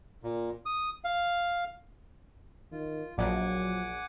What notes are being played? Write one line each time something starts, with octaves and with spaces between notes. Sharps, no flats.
A#2
D#6
F5
D#3 F4
A#1 F#3 F#5 G#5 D6